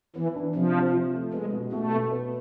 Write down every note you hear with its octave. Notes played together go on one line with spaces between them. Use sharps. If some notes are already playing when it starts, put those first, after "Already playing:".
E3 B3
D4
C3 F3
C3
F3
A3
G#3 B3
B2
B2 A3
B2
B3